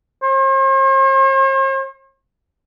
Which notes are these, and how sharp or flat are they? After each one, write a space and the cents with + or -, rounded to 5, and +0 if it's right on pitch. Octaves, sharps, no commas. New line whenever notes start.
C5 +45